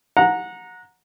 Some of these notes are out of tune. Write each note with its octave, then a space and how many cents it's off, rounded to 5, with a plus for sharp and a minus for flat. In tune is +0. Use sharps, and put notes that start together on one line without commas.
F#5 -25 A#5 +0